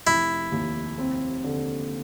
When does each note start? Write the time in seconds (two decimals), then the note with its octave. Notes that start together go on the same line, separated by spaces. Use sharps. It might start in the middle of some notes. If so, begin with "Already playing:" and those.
0.07 F1 E4
0.52 D#2
0.98 C4
1.44 D3